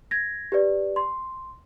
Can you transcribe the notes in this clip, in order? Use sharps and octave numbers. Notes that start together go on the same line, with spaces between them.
G#6 A#6
G4 B4 D5
C6